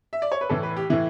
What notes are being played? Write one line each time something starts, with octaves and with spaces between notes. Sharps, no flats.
E5
D5
C#5
B4
A2 E3 A4
B4
G4
A2 E3 E4